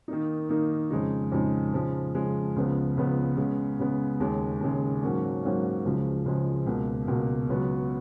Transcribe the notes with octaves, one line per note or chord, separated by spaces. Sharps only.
D#3 A#3 D#4
D#3 A#3 D#4
F2 C#3 G#3 D#4
F2 C#3 G#3 D#4
C#3 F3 G#3
C#3 F3 G#3
C#2 C#3 F3 B3
C#2 C#3 F3 B3
C#3 G#3 B3
C#3 G#3 B3
D#2 C#3 G#3
D#2 C#3 G#3
G#2 F#3 A#3 C#4
G#2 F#3 A#3 C#4
C#2 C#3 F3 G#3
C#2 C#3 F3 G#3
C#2 B2 A#3
C#2 B2 A#3
C#2 C#3 F#3 B3 F#4